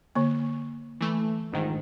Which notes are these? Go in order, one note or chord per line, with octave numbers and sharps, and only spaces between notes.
D3 A#3
E3 A3
A#1 G#2 D#3